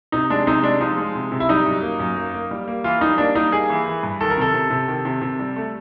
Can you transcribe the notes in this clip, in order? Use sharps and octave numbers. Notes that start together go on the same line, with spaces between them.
C3 D#4
G#3 D4
C3 D#4
G#3 D4
F3 D#4
G#3
C3
C3
E4
G3 D#4
F#2
A#3
F#2
A#3
A#3
G3
A#3
E3 F4
G3 D#4
A#3 D4
G3 D#4
A#3 G#4
E3
E3
G2
D#3 A4
A#4
C3 A4
C3
C3
D#3
C3
C3
G3
A3